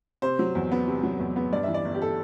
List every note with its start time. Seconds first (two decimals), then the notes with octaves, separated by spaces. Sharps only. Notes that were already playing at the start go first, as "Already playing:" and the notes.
0.22 C3 C5
0.39 F#3
0.55 E2
0.72 B3
0.87 C3
1.03 F#3
1.20 E2
1.36 B3
1.52 G2 D5
1.63 E3 E5
1.74 D5
1.85 G1
1.95 G4
2.02 A4